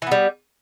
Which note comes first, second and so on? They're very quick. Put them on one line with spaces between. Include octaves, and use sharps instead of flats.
E3 B3 G3